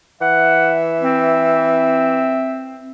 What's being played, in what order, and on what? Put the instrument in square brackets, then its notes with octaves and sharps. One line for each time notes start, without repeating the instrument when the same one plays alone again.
[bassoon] E3 [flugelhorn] E5 [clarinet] F#5
[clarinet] C4